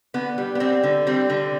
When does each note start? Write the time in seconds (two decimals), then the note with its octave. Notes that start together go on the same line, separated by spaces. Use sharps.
0.14 D3 B3
0.38 G3
0.55 B3
0.60 G3 C4
0.83 D3
1.07 G3 C4
1.30 D3